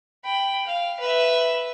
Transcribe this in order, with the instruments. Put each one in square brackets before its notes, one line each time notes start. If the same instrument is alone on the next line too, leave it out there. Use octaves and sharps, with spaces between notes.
[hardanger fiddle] G5 B5
F5
B4 E5